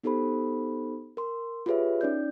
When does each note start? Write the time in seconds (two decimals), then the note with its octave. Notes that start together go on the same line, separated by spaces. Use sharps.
0.03 B3 D#4 G4 A4 C5 B5
1.17 A#4 C6
1.66 F4 G4 G#4 B4 C#5 E5
2.01 C#4 D#4 D5 G6